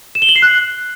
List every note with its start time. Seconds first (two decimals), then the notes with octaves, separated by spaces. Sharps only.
0.15 E7
0.22 G7
0.29 F#7
0.36 C7
0.42 F#6